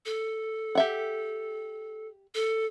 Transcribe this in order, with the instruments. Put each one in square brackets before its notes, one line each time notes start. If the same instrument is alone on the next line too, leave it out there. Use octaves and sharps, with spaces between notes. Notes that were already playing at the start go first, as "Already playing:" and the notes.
[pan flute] A4
[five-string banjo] G4 E5 F#5
[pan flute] A4